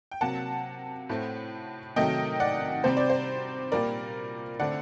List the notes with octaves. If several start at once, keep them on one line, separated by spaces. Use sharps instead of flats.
G5
C3 F#3 A#3 F#5 A5
A2 A3 C4
C3 D#3 F#3 A3 D#5 G5
D5 F#5
C3 G3 C4 C5
D5
C5
A#2 G3 A#3 A#4 D5
D3 A3 C4 D5 F#5